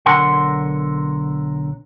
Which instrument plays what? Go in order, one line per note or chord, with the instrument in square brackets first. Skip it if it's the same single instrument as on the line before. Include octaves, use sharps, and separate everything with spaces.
[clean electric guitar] B1 D3 A#4 F#5 C6